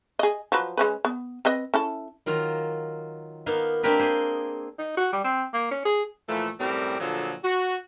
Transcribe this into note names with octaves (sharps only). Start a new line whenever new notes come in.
G#4 D#5
F3 F#3 B4
G#3 C#4 B4
B3
C4 B4 D#5
C#4 E4 A4
D#3 F#3 F4 A#5
A#3 B3 D#4 F5
A#3 C4 D4 G4 A#4 B4
G#4 C5
D#4
F#4
G3
C4
A#3
C#4
G#4
A#2 E3 F3 A3
F#2 A2 G3 C4 G4 A#4
A#2 D3 F3 F#3 G#4 A4
F#4